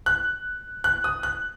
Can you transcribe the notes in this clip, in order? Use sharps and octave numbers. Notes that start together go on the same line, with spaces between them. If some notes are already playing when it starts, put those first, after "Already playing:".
F#6
F#6
D#6
F#6